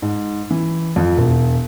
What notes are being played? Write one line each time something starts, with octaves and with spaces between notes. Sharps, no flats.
G#2
E3
F2
E1